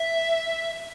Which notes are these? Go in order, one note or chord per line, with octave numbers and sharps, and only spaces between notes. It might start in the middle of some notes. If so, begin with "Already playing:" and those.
Already playing: E5